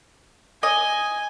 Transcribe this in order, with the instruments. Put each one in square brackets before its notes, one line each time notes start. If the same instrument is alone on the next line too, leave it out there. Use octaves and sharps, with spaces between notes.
[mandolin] D#5 [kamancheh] G#5